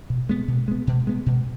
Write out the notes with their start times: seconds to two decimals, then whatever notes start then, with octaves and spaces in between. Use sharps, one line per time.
0.10 B2
0.29 G#3 B3
0.48 B2
0.68 G#3 B3
0.87 B2
1.07 G#3 B3
1.26 B2